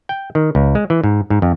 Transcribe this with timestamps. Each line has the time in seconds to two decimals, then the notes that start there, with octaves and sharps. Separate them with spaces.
0.09 G5
0.35 D#3
0.55 C#2
0.75 G#3
0.90 E3
1.04 G#2
1.30 G#2
1.42 F2